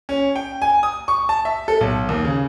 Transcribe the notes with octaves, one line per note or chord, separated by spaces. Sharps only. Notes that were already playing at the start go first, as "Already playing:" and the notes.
C#4
G5
G#5
D#6
C#6
A5
E5
A4
B1
D#2
C#3